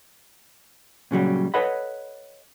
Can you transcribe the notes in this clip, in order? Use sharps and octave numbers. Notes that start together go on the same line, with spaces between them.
A#2 C#3 F#3 G3
A4 B4 C#5 D#5 F#5 B5